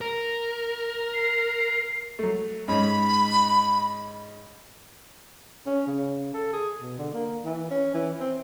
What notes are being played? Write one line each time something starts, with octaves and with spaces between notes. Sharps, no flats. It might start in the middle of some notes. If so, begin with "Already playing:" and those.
A#4
C7
F#3 A3
G#2 G#3 C#4 B5
C#4
C#3
A4
G#4
B2
D3
A#3
E3
C#4
E3
C4